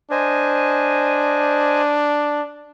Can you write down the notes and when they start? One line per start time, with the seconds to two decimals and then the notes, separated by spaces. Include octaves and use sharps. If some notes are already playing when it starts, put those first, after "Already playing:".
0.11 D4 C5 D#5 G#5